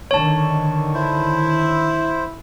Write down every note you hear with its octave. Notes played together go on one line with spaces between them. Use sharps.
D3 D#3 C#5 A5 C#6
E4 C5